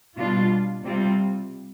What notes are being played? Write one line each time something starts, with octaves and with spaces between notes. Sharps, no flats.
B2 G3 D4 F4
C3 G3 C4 F4